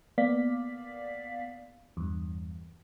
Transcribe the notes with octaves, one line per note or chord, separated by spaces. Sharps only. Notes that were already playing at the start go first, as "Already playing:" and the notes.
A#3 B3 D5 F5 B6
E2 G2